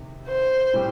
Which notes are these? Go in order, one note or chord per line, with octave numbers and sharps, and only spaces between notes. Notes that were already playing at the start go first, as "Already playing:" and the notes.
Already playing: C3 D#3
C5
A2 G3 C4 G4